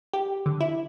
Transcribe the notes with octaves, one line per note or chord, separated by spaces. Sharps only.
G4
D3
E4